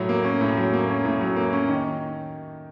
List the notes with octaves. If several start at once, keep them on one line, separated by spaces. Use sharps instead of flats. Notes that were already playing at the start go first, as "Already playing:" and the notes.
Already playing: A2 F#3
A#3
C#4
A2
F#3
A#3
C#4
A2
F#3
A#3
C#4
D#3